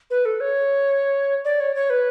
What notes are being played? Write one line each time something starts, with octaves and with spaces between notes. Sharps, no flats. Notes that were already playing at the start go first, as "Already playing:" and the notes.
B4
A4
C#5
D5
C#5
C#5
B4